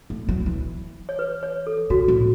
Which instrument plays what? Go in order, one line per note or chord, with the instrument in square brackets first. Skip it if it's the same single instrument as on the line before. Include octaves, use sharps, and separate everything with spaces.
[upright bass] A3
F#3
E3
[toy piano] C#5
B4
C#5
A4
[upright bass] C#3 [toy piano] F#4
[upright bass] A2